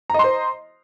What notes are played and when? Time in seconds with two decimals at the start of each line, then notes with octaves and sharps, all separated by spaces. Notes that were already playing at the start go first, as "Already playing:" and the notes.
0.10 A#5
0.14 D#5
0.19 C6
0.24 C5